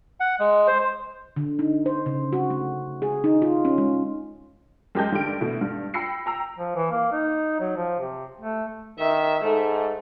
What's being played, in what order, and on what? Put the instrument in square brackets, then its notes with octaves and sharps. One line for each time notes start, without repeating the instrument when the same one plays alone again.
[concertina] F#5
G#3
C5
[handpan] D3
D#4
C5
C#3
F#4
A3
G#4
D#4
F4
C#4
G#3
[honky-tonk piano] F#2 G#3 G4 D#5 A5 G6
G2 D3 G4 D7
B2 A3 E4
G2
G5 B5 E6 A#6 C7 C#7
G5 A#5 E6
[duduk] F3
E3
A#3
D#4
F#3
F3
C3
A3
[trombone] D#3 [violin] E5
[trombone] G#2 [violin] A3